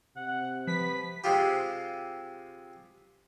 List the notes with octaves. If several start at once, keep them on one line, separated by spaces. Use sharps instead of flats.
C3 F#5
F3 B4 B6
C3 G#3 C4 F4 G4